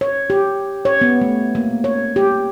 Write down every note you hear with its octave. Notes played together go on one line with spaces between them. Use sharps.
C#5
G4
C#5
B3
A3
A#3
C#5
G4